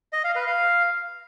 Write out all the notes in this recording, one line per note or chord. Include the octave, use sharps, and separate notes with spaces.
D#5
F5
B4
F5